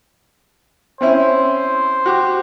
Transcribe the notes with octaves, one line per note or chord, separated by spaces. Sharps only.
C4 C#4 E4 C5
F#4 G4 D6